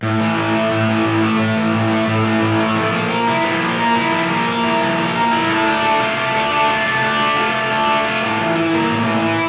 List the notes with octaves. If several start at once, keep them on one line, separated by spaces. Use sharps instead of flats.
A2
E3
A2
A3
A2
E3
A2
A3
A2
E3
A2
A3
A2
E3
A2
A3
F3
A#3
A#4
E4
F3
A#3
A#4
E4
F3
A#3
A#4
E4
F3
A#3
A#4
E4
A3
D4
A3
F4
A3
D4
A3
F4
A3
D4
A3
F4
A3
D4
A3
F4
A2
E3
E4
A#3
A2
E3
E4